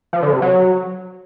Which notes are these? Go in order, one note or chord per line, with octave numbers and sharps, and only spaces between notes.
F3
D3
C3
F#3